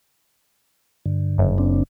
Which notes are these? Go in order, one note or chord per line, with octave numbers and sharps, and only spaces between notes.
G2 D3
F#1
C4 D4